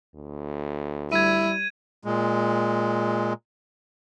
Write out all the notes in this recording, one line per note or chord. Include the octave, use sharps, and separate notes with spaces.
D2
G3 E4 G#6 D#7
A#2 G#3